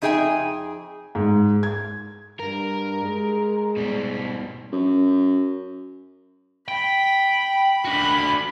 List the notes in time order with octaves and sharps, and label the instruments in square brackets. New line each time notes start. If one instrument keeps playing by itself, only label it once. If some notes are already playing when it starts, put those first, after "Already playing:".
[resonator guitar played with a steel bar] F2 D#4 G#4 E5 G5 G#5
[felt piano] G#2
G#6
[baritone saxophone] G2 [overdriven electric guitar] A#4
[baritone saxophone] G#3
[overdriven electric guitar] B2 G3
[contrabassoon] F#2
[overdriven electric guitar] G5 [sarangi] B5
[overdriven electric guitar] D4 F#4 [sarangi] B5